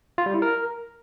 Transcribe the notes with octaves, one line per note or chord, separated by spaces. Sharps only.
F4
G3
E4
A#4